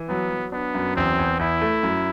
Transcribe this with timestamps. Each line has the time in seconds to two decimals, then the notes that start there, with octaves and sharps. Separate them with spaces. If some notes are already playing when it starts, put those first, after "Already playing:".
Already playing: E3
0.09 F#3 B3
0.31 F#3
0.52 B3 D4
0.75 F#2
0.96 E2 C4
1.19 E2
1.39 E2 E4
1.61 A3
1.83 F#2